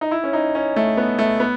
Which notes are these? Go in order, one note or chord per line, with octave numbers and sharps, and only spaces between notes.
D#4
E4
C#4
D#4
C#4
A3
B3
A3
B3